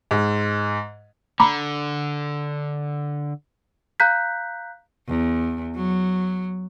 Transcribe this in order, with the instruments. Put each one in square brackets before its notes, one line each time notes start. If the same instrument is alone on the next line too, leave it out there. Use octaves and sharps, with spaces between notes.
[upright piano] G#2
[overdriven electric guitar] D3 [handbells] A#5 B5 D6
[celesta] F5 A#5 F#6 G6 B6
[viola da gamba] E2
F#3